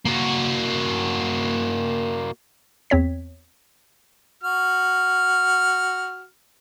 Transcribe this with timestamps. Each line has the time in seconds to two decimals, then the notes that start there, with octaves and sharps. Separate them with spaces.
0.06 A#3 F#4
2.90 E2 C4 C#5 B6
4.43 F#4 F6